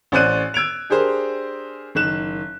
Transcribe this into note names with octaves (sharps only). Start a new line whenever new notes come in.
A1 C#4 C5 D5 F#6 D#7
E6 G#6 D7 F7
D4 G4 G#4 A#4 C5
F#1 D#3 F#6 E7